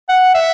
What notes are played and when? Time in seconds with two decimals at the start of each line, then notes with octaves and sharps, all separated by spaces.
0.09 F#5
0.35 E5